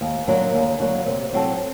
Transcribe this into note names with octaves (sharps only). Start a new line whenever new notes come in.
D#2
D3 F#3 A#3 F#4
D#2
D3 F#3 A#3 F#4
C3
F#3 C4 F#4 A4